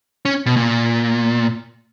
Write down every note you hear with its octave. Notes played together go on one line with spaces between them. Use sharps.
C#4
B2
A#2